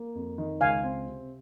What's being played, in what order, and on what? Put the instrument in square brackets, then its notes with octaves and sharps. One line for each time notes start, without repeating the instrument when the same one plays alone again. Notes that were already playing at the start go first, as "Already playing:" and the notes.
Already playing: [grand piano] A#3
F2
D#3
[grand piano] C#2 [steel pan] F5 G#5
[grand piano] C4
C3